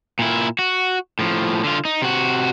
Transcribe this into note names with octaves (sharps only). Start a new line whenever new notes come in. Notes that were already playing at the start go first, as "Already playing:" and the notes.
A#2 E4
F#4
A2 F3
D3 F4
D#4
C3 F#4